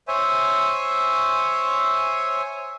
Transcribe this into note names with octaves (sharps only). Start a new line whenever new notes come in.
C5 C#5 E5 G#5